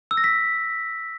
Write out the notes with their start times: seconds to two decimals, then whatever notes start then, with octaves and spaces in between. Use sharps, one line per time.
0.11 E6
0.17 A#6
0.24 B6